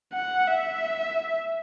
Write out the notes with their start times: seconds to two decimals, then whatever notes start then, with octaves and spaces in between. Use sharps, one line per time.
0.13 F#5
0.47 E5